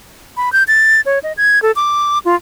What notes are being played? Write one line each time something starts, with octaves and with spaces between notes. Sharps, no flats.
B5
G6
A6
C#5
D#5
G#6
A4
D6
F4